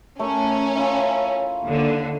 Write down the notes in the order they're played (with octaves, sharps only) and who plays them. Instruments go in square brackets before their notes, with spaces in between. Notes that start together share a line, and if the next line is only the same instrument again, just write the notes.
[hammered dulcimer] A3 A#4 [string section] C#4
[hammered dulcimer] E4 F4
[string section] D#2 D3